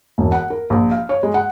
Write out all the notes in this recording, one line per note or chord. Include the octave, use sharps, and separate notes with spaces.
E1
F#5
A#4
A#1
F5
C#5
G#3
F#5